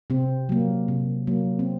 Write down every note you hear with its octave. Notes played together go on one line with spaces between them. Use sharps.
C3 C4
F#3 A#3
C3
F#3 A#3
C4